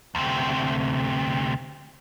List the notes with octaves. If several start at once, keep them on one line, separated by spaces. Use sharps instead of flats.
D2 C3